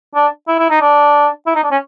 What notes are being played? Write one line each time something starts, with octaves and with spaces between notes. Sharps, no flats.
D4
E4
E4
D#4
D4
E4
D#4
D4
C#4